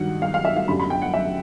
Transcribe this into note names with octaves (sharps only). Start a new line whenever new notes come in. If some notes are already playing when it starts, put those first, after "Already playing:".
Already playing: G2 D#3 F#3 F#5
F5
F5
E5
F5
F#2 D3 G3 B5
B5
G5
F#5
E5